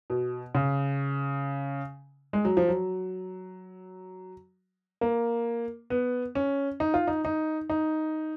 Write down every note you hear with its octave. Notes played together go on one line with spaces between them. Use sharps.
B2
C#3
G#3
F#3
F3
F#3
A#3
B3
C#4
D#4
F4
D#4
D#4
D#4